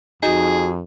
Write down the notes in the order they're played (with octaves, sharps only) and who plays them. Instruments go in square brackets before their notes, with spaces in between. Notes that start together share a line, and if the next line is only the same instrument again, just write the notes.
[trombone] F2 [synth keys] D#4 [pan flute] F#4 [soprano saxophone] G#4